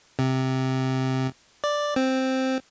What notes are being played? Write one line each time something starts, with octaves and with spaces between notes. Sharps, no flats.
C3
D5
C4